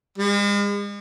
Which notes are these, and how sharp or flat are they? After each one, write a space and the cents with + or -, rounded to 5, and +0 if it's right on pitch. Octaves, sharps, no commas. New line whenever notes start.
G#3 -40